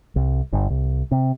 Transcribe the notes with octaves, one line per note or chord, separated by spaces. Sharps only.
C2
G1
C2
C3